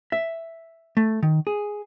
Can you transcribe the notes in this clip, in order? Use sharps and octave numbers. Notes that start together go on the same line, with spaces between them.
E5
A3
D#3
G#4